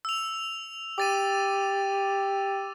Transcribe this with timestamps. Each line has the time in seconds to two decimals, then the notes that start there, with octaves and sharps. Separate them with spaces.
0.05 E6 F7
0.98 G4 D6 A6 D#7